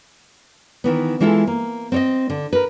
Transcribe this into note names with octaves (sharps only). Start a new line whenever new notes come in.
D#3 E3 B3
E3 G#3 E4 F4 G#4 A4
A#3
C4 C#5 D#5
D3
A#4 B4